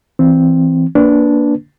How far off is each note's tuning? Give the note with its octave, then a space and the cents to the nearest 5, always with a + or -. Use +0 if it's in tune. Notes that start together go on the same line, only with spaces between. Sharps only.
E3 -5 C4 +0
A#3 +0 D4 -10 B4 +0